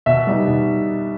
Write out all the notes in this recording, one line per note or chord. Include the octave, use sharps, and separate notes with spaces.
B2 E5
G3 B3 D#4
B2